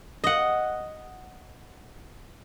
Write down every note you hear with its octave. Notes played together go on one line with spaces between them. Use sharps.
D#5 F#5